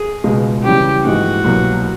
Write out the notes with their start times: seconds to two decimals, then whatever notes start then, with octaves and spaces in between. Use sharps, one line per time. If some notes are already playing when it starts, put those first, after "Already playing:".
Already playing: G#4
0.24 C#2 B2 G#3
0.64 C#3 E3 G3 G4
1.04 A#1 G#2 E3 G#3 F#4
1.44 C2 B2 F#3 A#3